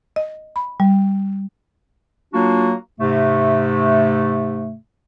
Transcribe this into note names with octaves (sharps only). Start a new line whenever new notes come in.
D#5
B5
G3
F#3 A#3 D4 F4 F#4
G#2 C3 A3